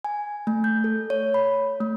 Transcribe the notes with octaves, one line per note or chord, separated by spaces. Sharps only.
G#5
A3
G6
A4
C#5
B5
A3